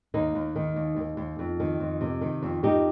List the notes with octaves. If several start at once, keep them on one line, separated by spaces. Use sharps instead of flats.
D#2 A#3 D#4
D#2
D#3
D#2
D#2
D#2
F2
D#3
F2
C3
D#3
F2
F2 D#4 G4